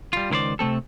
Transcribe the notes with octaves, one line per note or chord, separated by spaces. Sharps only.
G3 F4
C#2 D#3 E4 C5 D5
C3 A3 C4 A4